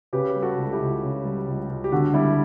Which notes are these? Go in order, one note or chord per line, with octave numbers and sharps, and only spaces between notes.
C#3 G4 B4
G3
F#4 A4
C#2
E4 G4
C#2
C#3
G3
C#2
C#2
G4
D3 F#4
G3 E4 G4